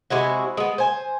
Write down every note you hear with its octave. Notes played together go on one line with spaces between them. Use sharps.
C3 G#3 E4 F#4
G#3 B3
C5 G#5